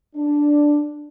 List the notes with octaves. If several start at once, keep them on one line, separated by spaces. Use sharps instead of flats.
D4